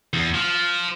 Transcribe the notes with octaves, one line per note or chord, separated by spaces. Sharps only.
E2
F3